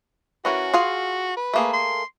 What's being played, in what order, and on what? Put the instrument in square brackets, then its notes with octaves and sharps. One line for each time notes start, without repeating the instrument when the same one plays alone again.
[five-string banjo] E3 C#4 A#4 [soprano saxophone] F#4
[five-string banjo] F4 G#4 F5
[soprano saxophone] B4
[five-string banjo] A3 A#3 G#4
[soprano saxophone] C6